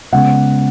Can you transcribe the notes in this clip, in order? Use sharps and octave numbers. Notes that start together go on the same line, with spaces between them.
C#3 G#3 B3 F#5